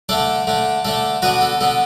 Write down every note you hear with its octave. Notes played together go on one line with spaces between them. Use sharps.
D3 A3 D4 A4 D5
D3 A3 D4
D3 A3 D4 A4
D3 B3 D4 F#4 B4
A4
D3 B3 D4 A4